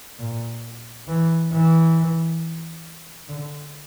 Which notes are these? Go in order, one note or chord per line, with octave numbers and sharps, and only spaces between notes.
A#2
E3
E3
D3